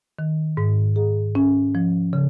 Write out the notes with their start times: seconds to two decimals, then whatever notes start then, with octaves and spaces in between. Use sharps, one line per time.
0.19 D#3
0.57 G#2
0.96 G#4
1.35 C#4
1.75 F3
2.13 C#3